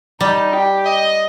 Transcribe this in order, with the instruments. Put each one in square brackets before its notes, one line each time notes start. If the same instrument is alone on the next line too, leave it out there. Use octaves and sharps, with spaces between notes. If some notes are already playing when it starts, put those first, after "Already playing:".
[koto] G3 [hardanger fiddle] D#4
[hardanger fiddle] G4
D#5